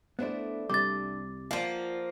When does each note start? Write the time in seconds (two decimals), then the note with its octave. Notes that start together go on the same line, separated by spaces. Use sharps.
0.19 A3 B3 D4 E4 C5 D5
0.70 C2 C3 G3 C4 D4 D6 A6
1.51 F3 A#3 F4 D5 F#5